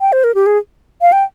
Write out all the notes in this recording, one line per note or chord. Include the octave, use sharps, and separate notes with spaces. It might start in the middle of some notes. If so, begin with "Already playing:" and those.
G5
C5
A#4
G4
G#4
F5
G5